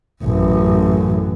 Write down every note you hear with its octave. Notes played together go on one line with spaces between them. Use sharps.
A1 F#2